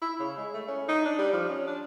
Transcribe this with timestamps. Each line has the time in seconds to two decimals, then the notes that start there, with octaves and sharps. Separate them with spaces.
0.02 E4
0.19 C#3
0.37 G#3
0.54 A3
0.68 C#4
0.88 D#4
1.05 D4
1.18 G3
1.33 F3
1.49 C#4
1.67 D4